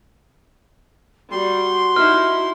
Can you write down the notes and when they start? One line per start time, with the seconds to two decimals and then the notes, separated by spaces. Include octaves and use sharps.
1.31 G3 F#4 C6
1.96 D#4 E4 F6